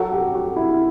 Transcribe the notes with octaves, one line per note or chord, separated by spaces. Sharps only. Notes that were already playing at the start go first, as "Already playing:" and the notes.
Already playing: F#3 A4
G4
F#4
E4